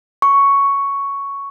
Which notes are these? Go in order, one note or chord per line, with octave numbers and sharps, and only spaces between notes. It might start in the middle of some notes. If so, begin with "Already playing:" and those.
C#6